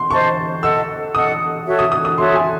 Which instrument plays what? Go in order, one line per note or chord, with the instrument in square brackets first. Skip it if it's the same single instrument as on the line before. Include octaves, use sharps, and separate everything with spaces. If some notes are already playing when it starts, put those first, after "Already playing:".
Already playing: [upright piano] C6
[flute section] C5 D#5 A5 [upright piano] C#6
[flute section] A4 D#5 F#5 [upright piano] E6
[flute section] A4 D#5 F#5 [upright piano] D#6
[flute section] F#4 A4 C#5 E5
[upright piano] D#6
D#6
D#6
[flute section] F#4 A4 C#5 E5 [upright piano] C6
[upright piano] G#5